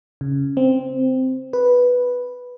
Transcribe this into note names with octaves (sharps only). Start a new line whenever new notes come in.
C#3
C4
B4